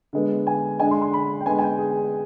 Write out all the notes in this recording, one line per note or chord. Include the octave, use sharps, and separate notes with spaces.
D3 G#3 B3
G#5
D3 G#3 D4 G#5
C6
C6
B5
G5
D3 G#3 B3 D4 G#5
G#5
G5
G#4